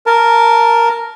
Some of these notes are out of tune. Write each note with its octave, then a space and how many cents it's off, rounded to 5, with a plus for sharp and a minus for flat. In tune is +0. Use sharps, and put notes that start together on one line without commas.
A#4 +0 A5 +0